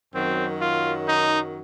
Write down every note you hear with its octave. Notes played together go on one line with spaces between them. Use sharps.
F#2 D#3 F#3 C4
F4
D#4